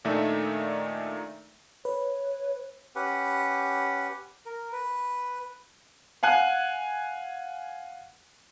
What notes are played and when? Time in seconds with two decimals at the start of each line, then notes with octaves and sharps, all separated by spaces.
0.05 A#2 D#3 A3 D4 D#4 E5
1.85 B4 C#5
2.96 C#4 G4 B4 F#5
4.46 A#4
4.72 B4
6.23 F5 F#5 G#5 F#6